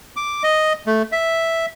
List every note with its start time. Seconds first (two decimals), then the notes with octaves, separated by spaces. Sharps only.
0.16 D6
0.43 D#5
0.87 A3
1.12 E5